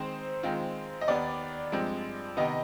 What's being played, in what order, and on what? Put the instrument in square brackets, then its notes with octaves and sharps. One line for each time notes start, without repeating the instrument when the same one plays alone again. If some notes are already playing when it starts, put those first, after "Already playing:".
Already playing: [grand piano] D#3 G#3 C4 D#4 [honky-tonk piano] C5
[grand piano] D#3 G#3 C4 F4
[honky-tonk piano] D#5
[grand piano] D#2 D#3 B3 [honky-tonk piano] D5
[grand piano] G2 F3 G#3 C4
[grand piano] C3 D#3 B3 [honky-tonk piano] D#5